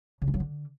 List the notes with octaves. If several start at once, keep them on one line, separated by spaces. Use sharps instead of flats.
C#3
A3
F#3
D3